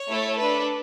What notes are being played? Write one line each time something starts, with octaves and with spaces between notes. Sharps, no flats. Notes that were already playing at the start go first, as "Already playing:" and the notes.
Already playing: C#5
A3 E4 A4
D4 A4 B4